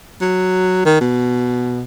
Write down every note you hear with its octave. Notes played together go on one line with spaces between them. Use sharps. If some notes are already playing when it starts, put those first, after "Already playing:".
F#3
D#3
B2